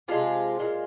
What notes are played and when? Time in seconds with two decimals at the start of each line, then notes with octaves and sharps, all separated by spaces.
0.08 C3 F3 G#3 F4
0.59 A#2 G#3